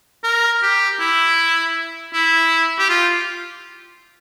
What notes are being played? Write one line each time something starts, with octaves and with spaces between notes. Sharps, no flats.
A#4
G4
E4
E4
G4
F4